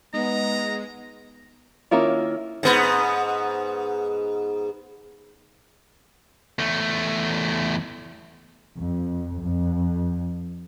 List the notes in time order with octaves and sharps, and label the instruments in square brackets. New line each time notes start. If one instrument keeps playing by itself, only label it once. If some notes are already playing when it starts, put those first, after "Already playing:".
[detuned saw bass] G#3 [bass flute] B3 [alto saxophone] D#4 [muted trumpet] A#5
[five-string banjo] D#3 A#3 C#4 E4 F4
[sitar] G#2 B3
[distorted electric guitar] E2 A3
[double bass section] F2
F2